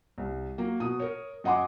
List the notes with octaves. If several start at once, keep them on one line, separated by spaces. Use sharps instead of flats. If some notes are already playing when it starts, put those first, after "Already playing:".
C2
F#3 A#3
B2 D#6
A#4 C#5
F#2 D#5 F#5 G#5 C6 D6